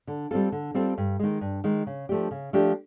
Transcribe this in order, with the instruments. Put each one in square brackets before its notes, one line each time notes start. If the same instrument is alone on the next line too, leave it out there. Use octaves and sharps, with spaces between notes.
[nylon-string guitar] D3
G3 C4 F4 A4
D3
G3 C4 F4 A4
G2
D#3 G#3
G2
D#3 G#3
C#3
F3 A3 D4 G4
C#3
F3 A3 D4 G4